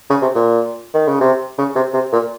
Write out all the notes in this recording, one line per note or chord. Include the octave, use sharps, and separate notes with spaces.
C#3
C3
A#2
D#3
C#3
C3
C#3
C3
C3
A#2